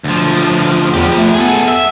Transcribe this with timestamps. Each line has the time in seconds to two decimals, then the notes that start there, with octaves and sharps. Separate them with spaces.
0.04 D2 F3
0.93 E2 F3 G4
1.17 A3
1.34 B3 G#4 A4
1.68 E5